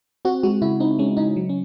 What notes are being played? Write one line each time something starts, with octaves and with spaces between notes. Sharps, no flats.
C4 F#4
G#3 F#4
C#3 E4
C4 D#4
G#3 C#4
C#3 D#4
F#3
C#4